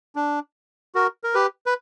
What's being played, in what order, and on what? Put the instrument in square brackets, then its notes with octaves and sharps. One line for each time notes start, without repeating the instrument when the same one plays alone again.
[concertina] D4
F#4 A#4
A#4
G4 B4
B4